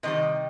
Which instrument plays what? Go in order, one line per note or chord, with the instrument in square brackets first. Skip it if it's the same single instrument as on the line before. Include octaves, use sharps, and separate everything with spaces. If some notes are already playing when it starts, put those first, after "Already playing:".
[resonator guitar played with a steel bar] C3 D#3 G3 D#5